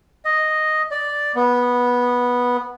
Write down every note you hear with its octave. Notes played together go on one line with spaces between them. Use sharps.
D#5
D5
B3